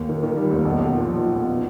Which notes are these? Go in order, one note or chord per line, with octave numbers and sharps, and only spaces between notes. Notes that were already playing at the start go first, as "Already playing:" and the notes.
Already playing: D#2
D#3
D#3
G3
D#2
B1
B1
A#2
F3
F3
B1
B3